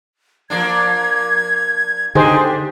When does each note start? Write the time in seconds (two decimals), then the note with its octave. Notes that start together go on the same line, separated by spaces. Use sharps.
0.50 F3 A#3 D4 G#6
2.15 D3 C4 D4 D#4 G4 G#4 C5